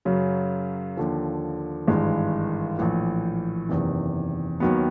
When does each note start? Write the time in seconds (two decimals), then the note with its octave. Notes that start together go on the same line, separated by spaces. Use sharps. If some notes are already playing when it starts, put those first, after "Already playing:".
0.05 F#2 C#3 F#3
0.97 D#2 D3 F3
1.88 G#1 G2 E3 G#3
2.79 A#1 A2 E3
3.69 F#1 E2 C3 D#3
4.60 D#2 D#3 F#3 B3